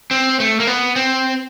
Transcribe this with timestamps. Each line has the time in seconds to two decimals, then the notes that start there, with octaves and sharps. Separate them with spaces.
0.11 C4
0.40 A3
0.60 A#3
0.67 B3
0.96 C4